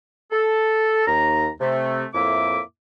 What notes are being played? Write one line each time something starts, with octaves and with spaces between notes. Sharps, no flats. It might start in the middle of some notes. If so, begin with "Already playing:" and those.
A4
D#2 A#5
C3 A3
F2 A2 A#3 E4 E5 D6